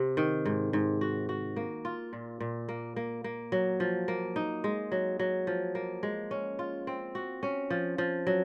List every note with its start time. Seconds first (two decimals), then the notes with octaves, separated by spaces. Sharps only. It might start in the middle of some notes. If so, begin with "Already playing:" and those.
Already playing: C3
0.17 D#3
0.45 G#2
0.73 G#2
1.01 F#4
1.29 F#4
1.56 A#3
1.85 F4
2.13 A#2
2.40 A#2
2.69 A#3
2.96 A#3
3.24 A#3
3.52 F#3
3.80 F3
4.08 A#3
4.36 D#4
4.64 G#3
4.92 F#3
5.19 F#3
5.47 F3
5.75 A#3
6.03 G#3
6.31 C#4
6.59 F4
6.87 C4
7.15 F#4
7.43 C#4
7.70 F3
7.98 F3
8.27 F#3